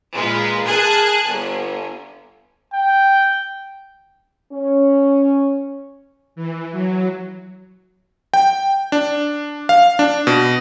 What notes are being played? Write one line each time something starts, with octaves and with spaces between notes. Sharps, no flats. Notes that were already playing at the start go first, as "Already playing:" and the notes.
A#2 G#3 F4 A#4 B4
G#4 A#4 G#5 A5 F#6 G#6
G1
G5
C#4
E3
F#3
G5
D4
F5
D4
B2